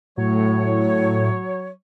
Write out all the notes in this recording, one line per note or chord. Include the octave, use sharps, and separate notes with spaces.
A2 F#3 C#5